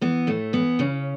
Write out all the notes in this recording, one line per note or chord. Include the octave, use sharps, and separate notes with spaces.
E3 B3
A2 A3
E3 B3
C#3 C#4